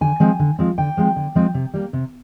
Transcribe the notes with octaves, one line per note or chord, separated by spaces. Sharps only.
D3 G#5
F3 G#3 C4
D3
F3 G#3 C4
D3 G5
F3 G#3 C4
D3
F3 G#3 C4
C3
G3 A#3
C3